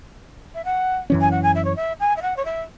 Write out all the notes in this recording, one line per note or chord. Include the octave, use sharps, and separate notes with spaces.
E5
F#5
F#2 E3 C#4
G#5
F#5
G#5
E5
C#5
E5
G#5
E5
F#5
C#5
E5